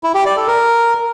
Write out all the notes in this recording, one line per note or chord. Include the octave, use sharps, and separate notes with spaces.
E4
G4
D5
A4
A#4